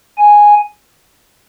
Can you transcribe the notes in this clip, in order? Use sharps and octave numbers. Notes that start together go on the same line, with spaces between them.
G#5